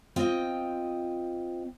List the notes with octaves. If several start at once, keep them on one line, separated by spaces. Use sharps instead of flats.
C4 F4 D#5 G5